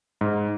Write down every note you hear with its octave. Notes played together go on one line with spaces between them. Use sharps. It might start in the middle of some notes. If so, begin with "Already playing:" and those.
G#2